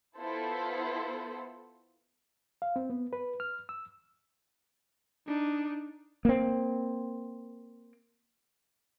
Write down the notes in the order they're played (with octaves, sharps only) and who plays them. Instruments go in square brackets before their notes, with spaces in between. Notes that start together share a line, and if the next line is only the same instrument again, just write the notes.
[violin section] B3 E4 F4 A4 C5
[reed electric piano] F5
C4
B3
B4
F6
E6
[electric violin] D4 D#4
[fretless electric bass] A#3 C4